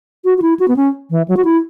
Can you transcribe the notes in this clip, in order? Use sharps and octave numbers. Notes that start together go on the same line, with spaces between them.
F#4
F#4
E4
F#4
B3
C#4
E3
F#3
F#4
E4